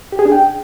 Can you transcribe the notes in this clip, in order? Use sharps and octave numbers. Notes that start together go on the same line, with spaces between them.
G4
G#4
D4
G5